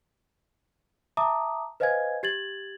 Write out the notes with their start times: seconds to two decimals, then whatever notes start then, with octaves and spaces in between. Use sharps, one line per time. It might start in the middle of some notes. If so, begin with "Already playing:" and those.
1.17 E5 A5 A#5 D6 D#6
1.80 B4 C5 D#5 F5 G#5 G#6
2.23 G4 G#6 A6 F#7